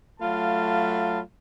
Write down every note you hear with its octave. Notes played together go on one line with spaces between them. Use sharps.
F#3 A3 F4 F5 A5 B5